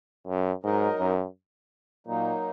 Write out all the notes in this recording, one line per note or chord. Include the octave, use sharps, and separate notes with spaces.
F#2
G#2 F#3 D#4 A#4 D#5
F#2
A#2 F#3 A#3 D#4